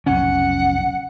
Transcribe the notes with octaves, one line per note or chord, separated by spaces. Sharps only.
F1 B1 C#3 C#4 F#5